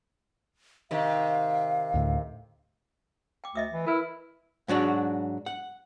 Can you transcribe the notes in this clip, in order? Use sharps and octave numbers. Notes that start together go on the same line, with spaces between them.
C3 D#3 F5
D2 A2
G5 D6
D2 D#5 E5 D#6
E3
E4 A#4 B4
G#2 F#3 D4 F#4
F#5